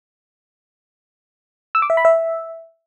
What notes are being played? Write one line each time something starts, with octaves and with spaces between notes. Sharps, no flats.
E6
D6
E5
B5
E5